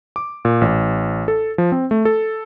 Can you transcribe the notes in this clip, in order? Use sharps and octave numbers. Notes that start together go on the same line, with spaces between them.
D6
A#2
A1
A4
F3
C4
A3
A4